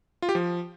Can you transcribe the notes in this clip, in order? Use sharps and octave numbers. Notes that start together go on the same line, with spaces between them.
F4
G4
F3